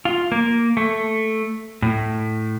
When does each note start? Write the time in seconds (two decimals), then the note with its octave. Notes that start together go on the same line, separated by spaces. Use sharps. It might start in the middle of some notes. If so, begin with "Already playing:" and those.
0.05 F4
0.32 A#3
0.77 A3
1.82 A2